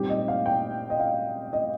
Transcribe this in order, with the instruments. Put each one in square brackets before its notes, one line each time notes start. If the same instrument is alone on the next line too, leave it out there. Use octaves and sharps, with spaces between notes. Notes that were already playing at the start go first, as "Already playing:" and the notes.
Already playing: [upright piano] A#2 G3 C4 D#4 G4
D#5
F5
G5
D#5
F5
D#5